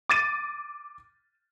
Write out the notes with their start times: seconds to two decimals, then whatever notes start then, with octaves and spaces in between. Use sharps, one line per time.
0.09 D6 A6 D#7